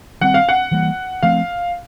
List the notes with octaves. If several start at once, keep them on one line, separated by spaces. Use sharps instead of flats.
D#3 G3 C4 F#5
F5
F#5
E3 G3 A#3
F3 A3 C4 F5